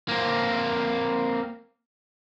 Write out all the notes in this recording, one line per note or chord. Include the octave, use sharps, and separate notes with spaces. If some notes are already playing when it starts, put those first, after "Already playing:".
A#3 C4